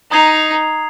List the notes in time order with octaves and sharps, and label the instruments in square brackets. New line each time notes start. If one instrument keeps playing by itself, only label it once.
[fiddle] D#4 [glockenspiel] A#5 D#6 G#6 C7 F7